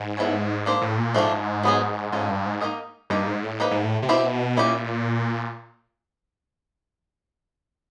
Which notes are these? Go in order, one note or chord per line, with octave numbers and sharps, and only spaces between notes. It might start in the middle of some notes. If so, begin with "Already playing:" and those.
Already playing: G#2
B3 E4 A4 C#5
A#3 D4 G4 C5
A2
A#2
G#2 F3 A3 D4 F4
F#3 B3 D#4 G#4
G#2 C#4 F4 A4
G2
G#2
A#3 D#4 G4 A#4 D#5
G2 A#3 D#4 G4
G#2
A2
F3 A#3 D#4 G4 B4
G#2
A2
C3
B2 C4 E4 G4
A#2 C#4 E4 G4